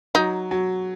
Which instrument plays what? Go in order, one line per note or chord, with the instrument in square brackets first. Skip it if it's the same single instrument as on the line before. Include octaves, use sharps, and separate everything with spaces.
[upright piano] F#3 [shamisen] D#4
[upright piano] F#3